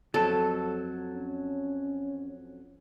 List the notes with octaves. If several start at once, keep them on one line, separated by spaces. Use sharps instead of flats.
F2 F#3 A4 A5
C#4